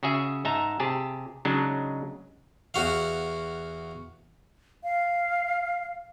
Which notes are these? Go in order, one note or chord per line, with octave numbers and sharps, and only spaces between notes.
C#3 F#4 G#4 E5
G#2 D#4 E5 A5 A#5
C3 G4 G#4 A5
C#3 F#3 G#3 D4 D#4
E2 F#4 F5
F5